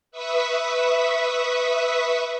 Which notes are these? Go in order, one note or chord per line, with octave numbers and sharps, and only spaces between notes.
B4 E5 C#6 D#6 B6